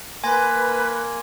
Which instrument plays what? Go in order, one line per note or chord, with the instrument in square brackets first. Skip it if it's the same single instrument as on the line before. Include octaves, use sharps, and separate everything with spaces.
[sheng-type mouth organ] A#3 [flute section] B4 [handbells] G#5 [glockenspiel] C6 G#6 A#6